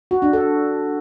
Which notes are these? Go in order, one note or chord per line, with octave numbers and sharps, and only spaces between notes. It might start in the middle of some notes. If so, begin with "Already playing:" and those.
F#4
D4
A4